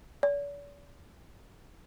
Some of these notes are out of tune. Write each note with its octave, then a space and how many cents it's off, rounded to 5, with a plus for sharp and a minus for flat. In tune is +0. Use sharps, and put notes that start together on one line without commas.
D5 -45